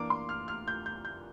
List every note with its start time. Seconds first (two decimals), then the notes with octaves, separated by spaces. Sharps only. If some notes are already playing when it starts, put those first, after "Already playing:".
Already playing: E3 A#3 D4 D6
0.10 C6
0.29 F6
0.48 F6
0.68 G6
0.86 G6
1.05 G6